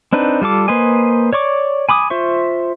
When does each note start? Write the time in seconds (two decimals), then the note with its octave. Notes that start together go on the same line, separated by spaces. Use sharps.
0.13 C4 D4 D#4 B4
0.42 G3 F4 A4 D6
0.68 A#3 B4 C5 D#5 G#5
1.33 C#5 D5 C#6 D6
1.89 G#5 B5 D6 D#6
2.10 F4 C5 E5 C#6